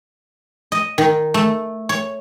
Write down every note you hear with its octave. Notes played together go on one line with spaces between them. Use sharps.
D#5
D#3
A3
C#5